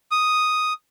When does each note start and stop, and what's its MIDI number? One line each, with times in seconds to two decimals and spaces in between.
0.11 0.73 87